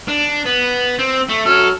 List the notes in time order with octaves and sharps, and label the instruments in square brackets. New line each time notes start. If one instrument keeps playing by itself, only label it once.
[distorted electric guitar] D4
B3
C4
A3
[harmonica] F#3 F6 [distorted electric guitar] A4